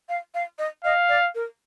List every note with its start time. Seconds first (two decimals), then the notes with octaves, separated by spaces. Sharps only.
0.09 F5
0.35 F5
0.59 D#5
0.84 D#5 F5
1.09 D5
1.35 A#4